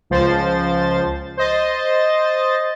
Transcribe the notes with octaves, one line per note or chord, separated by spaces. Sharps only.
C#2 F3 C5 A6
C5 D#5 A6